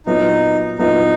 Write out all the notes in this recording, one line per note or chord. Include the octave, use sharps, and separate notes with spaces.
A#2 F#3 B3 D#4 E4
A#2 F#3 B3 D#4 E4